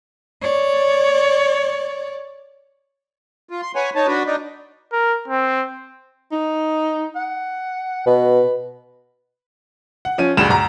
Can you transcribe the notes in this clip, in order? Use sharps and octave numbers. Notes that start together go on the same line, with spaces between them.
C#5 D5
F4
C6
B4 C#5 F#5 G#5
D#4 C#5 A5
D4 F#4 B4
D4 D#4
A#4
C4
D#4
F#5
B2 B4
F#5
F3 C#4 D#7
D2 G2 G#3 E7 F7
D2 A#5